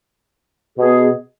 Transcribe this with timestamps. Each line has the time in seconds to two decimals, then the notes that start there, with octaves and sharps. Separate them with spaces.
0.77 B2 B3 G#4